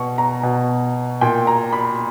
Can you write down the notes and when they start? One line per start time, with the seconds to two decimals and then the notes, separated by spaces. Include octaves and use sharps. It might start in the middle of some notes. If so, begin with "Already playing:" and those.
Already playing: B2 C#6
0.18 A#5
0.43 B2
1.21 A#2 G5
1.47 A#5
1.73 B5